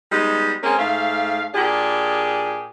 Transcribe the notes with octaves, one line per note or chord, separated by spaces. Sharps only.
G3 G#3 B3 D#4
G#3 A#3 C4 C#4 G#4
G#2 A3 F5
A#2 D4 G4 G#4